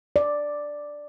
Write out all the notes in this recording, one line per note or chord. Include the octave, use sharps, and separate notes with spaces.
D5